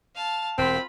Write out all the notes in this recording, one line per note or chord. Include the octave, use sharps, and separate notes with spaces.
F5 A5
E1 C4 F4 B5